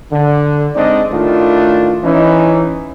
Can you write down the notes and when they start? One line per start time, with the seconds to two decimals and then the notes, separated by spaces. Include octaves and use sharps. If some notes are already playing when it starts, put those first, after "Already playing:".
0.12 D3
0.74 G#3 C4 D4 D#4 D5 D#5
1.11 A2 D#3 A3 D4 F4
2.04 E3 C#4 D#4